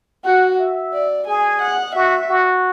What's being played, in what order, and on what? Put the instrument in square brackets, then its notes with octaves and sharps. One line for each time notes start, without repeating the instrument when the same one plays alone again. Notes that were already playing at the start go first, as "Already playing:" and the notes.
[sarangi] F#4 [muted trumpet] F#5
[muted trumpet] E5
[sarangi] D5
[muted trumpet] G#4 [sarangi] G#5
[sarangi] F#5
[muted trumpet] F#4 [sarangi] E5
[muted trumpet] F#4